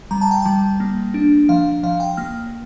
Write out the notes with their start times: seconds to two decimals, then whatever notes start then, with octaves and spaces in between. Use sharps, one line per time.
0.11 G3 A#5
0.21 A5
0.31 G5
0.42 G3 A5
0.80 A#3
1.14 D4
1.49 F3 F5
1.83 F3 F5
2.00 G5
2.17 A#3 F6